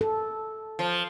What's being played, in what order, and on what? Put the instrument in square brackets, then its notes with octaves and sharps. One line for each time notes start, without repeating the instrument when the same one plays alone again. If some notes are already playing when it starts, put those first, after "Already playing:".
[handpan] A4
[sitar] F3